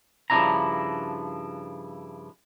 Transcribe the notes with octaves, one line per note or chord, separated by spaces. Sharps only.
G2 C#3 F3 D4 E4 A#5